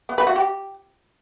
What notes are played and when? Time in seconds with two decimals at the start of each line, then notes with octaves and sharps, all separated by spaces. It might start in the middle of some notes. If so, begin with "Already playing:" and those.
0.09 B3
0.18 B4
0.27 F#4
0.36 G4